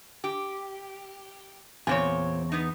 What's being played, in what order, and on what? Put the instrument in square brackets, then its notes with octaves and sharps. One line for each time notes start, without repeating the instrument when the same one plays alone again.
[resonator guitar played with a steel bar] G4
[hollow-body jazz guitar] E2 G#5 [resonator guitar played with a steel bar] A#2 C4 C#5
[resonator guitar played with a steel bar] B3 D#4